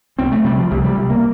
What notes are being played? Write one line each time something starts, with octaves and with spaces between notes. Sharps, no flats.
C2 C4
A3
C3 G3
F3
C2 G3
G3
C3
A#3